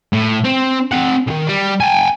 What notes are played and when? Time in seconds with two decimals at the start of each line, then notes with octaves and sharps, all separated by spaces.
0.12 A2
0.45 C4
0.91 C4 F#5
1.27 B1 D#3
1.47 G3
1.80 G5 G#5